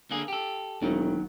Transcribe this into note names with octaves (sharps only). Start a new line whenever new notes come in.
D3 A#3 G#4
G4 A4
E1 D#2 D#3 F#3